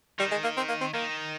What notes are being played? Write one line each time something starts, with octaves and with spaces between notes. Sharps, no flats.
D#3 G3
G#3
A#3
C4
A#3
C4
D#3 A#3